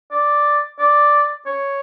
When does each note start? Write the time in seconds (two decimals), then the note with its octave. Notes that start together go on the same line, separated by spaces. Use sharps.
0.11 D5
0.79 D5
1.46 C#5